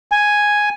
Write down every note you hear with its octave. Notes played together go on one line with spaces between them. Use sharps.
G#5